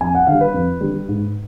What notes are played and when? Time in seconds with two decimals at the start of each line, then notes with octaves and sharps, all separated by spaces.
0.01 F2 G#5
0.15 F#5
0.27 D3 F5
0.32 G3
0.41 B4
0.54 F2
0.81 D3 G3
1.08 G#2